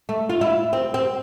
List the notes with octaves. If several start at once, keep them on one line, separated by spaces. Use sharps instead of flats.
A3
F4
E4
C4
C4